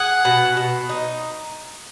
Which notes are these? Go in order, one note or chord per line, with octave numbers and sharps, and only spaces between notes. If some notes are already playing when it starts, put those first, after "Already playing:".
Already playing: G#4 F#5
B2
B2
D#4